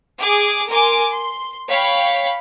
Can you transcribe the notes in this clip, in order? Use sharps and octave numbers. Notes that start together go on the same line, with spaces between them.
G#4 D6
A#4 G#5 C6 D6
C6
C#5 F5 G5 B5